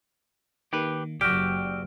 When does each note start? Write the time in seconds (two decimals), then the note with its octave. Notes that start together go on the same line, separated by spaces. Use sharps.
0.73 D#3 A#3 G4 B4
1.21 F#1 F#4 G4 D5 G5 E6 F6 D7